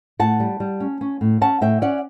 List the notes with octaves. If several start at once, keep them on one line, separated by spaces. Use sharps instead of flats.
A2 F#5 A5
G3
G3
C#4
C#4
A2
C#4 F#5 A5
A2 E5 G5
C#4 D5 F#5